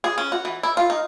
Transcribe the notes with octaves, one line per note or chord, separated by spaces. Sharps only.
G#4
C#4
F#4
E3
E4
F4
D#4